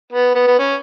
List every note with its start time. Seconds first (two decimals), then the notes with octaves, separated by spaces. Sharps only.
0.12 B3
0.35 B3
0.47 B3
0.59 C#4